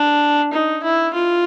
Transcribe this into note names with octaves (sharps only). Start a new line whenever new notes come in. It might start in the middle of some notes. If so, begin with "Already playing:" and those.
Already playing: D4
D#4
E4
F4